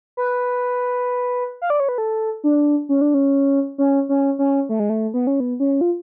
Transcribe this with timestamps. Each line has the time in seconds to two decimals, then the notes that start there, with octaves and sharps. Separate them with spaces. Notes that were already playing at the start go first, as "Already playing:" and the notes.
0.17 B4
1.62 F5
1.70 D5
1.80 C#5
1.89 B4
1.98 A4
2.44 D4
2.89 C#4
3.01 D4
3.14 C#4
3.78 C#4
4.09 C#4
4.39 C#4
4.69 A3
4.80 G#3
4.90 A3
5.14 B3
5.27 C#4
5.40 B3
5.60 C#4
5.81 F4